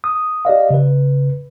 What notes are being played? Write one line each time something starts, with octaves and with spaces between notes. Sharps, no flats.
D#6
G4 D5 D#5 F5
C#3 B4